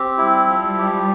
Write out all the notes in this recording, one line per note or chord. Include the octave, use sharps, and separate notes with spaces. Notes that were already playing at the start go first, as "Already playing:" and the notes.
Already playing: C4 G4
G3 E4
F3
G4